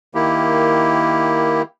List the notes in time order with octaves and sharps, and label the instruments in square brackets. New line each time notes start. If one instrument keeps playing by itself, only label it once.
[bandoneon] D#3 A#3 E4 G4